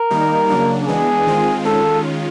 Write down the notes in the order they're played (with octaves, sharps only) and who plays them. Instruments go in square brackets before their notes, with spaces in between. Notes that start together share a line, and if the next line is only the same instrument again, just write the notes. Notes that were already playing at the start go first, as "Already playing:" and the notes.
Already playing: [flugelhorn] A#4
[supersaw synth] D#3 G3 A#3 D#4
C#3 F#3 A#3 D4
[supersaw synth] E3 G#3 B3 D4 [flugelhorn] G#4
[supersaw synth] D#3 G#3 C4 F4
[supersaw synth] D#3 G#3 C#4 F4 [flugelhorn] A4